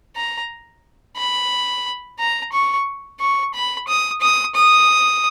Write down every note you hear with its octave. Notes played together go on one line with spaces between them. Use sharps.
A#5
B5
A#5
C#6
C#6
B5
D#6
D#6
D#6